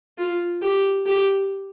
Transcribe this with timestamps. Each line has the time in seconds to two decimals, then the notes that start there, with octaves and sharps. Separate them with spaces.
0.18 F4
0.61 G4
1.06 G4